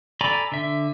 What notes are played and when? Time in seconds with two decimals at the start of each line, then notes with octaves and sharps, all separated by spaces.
0.21 A4 D5 G#5 A#5 B5
0.52 D3 E5